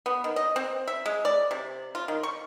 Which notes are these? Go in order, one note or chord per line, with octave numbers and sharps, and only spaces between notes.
B3
D#3
D#5
C4
E5
G#3
D5
C3
F4
D#3
C#6